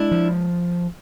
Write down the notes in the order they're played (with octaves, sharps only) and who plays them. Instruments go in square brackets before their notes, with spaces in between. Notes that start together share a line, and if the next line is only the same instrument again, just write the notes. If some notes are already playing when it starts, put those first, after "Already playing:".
Already playing: [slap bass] G#3 [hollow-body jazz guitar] D4 E4
[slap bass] F3